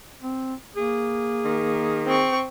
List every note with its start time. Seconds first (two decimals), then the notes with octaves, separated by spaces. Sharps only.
0.22 C4
0.76 A#3 G#4
1.45 D#3
2.06 C4 C#6